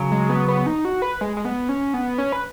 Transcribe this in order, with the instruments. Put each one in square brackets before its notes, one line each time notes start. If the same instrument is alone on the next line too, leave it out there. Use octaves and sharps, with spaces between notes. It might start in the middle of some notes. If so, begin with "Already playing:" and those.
Already playing: [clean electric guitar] C#3 F#3
[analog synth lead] G#3
B3
B3
D#4
F#4
B4
G#3
G#3
B3
C#4
B3
C#4
B4